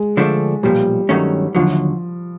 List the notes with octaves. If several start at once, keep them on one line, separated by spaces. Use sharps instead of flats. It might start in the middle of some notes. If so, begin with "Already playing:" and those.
Already playing: G#3
D3 F3 A3 D4
B1 A#2 F3 G3
G2 D#3 F#3 A3 C#4
D#2 D3 F3 F#3